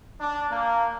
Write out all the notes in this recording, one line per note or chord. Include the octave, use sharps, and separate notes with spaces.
D4
A#3